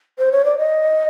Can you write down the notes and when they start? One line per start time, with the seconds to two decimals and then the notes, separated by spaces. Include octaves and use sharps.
0.18 C5
0.32 C#5
0.45 D5
0.58 D#5